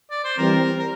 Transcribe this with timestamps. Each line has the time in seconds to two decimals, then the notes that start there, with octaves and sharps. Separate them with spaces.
0.10 D5
0.24 C5
0.37 E3 G3 C4 A#4
0.79 A#4